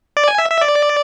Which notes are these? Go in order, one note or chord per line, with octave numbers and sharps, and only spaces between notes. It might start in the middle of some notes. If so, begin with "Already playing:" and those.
D5
G#5
E5
E5
D5